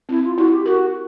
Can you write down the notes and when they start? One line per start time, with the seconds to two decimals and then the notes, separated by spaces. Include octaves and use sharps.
0.09 C4 E4
0.24 F4
0.38 E4 F#4
0.52 G4
0.65 F#4 A#4